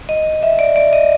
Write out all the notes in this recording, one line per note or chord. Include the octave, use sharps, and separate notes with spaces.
D#5
E5
D5
D5
D#5